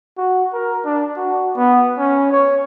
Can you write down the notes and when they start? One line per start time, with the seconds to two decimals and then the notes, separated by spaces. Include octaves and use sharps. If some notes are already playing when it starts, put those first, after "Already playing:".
0.17 F#4
0.53 A#4
0.85 D4
1.17 F#4
1.56 B3
1.98 C#4
2.32 C#5